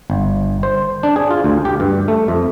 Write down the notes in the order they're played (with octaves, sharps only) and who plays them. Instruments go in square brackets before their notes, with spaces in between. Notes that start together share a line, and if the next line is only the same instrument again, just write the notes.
[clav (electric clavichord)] G1
C5
D4
G#4
F4
D2
G4
G2
A3
F2